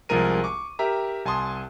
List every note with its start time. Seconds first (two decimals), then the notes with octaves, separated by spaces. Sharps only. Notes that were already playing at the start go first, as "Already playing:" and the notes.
0.09 C2 F3 G#3 G#4 A#4 D#7
0.44 C#6 D6
0.79 G4 A#4 E5 A#5
1.25 C2 G#5 A5 C6 D#6